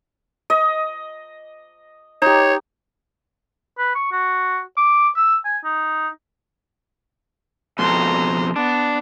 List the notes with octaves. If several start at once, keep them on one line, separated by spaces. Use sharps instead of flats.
D#5
D#4 G4 C#5
B4
C#6
F#4
D6
E6
G#5
D#4
F2 B2 A#5 C6
B3 D4